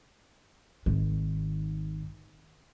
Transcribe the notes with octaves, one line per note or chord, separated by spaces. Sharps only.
G#1 D#3